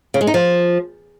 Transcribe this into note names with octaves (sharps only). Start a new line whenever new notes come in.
C#3
G#3
D#4
F3